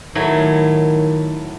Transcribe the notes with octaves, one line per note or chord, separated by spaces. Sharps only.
A2 D#3 F#3